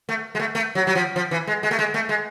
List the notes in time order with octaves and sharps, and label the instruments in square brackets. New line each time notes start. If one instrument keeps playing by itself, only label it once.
[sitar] A3
G#3
A3
A3
F#3
F#3
F3
F3
E3
G#3
G#3
A3
G#3
A3
G#3